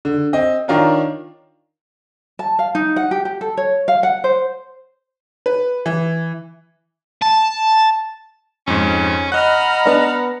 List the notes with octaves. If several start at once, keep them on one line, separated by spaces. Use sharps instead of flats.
D3
C4 D#5
D#3 D4 F4 A#4 C#5
A5
F5
D#4
F#5
G4
G4
A4
C#5
F5
F#5
C5
B4
E3
A5
F2 G#2 C#4
D#5 F#5 A#5 B5 F6 F#6
B3 D4